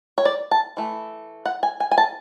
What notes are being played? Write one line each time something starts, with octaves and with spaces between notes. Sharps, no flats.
C#5
D5
A5
E3 A3
F#5
G#5
G#5
G#5
A5